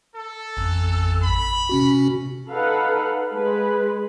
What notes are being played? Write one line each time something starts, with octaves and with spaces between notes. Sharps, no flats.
A4
A1 F2
B5
C3 C#4 F#4
D#4 A4 B4 F5 F#5
G#3 B4